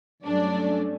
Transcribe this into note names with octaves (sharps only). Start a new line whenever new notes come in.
G2 F#3 A3 C#4 D4 D5